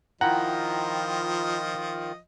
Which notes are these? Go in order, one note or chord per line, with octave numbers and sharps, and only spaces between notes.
D#3 F3 E4 F4 D#5 F#5 G5 A#5